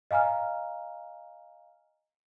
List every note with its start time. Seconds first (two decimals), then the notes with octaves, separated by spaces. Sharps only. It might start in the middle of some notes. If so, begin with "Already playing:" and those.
0.11 D#5 F5 G#5 A#5 F6